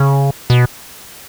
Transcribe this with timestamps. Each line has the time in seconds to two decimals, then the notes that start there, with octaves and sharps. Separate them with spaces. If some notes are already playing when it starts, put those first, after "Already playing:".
Already playing: C#3
0.50 B2